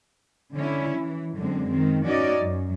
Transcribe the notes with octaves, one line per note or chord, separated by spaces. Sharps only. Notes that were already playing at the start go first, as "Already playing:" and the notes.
D3 C#4 E4
E3
F#2 D3 G#3 C4
D#3 C4
C#4 D#4 F#4 D5 D#5
F#2